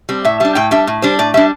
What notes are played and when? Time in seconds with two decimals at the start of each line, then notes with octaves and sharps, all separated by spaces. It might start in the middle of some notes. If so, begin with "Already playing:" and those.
0.09 G3 C4
0.25 A2 E5
0.40 G3 D4 E5
0.55 A2 G5
0.71 G3 D4 E5
0.87 A2
1.02 G3 D4 C5
1.19 A2 D5
1.34 G3 D4 E5